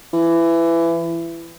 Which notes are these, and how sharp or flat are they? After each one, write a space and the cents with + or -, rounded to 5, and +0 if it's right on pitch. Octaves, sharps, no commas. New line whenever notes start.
E3 +20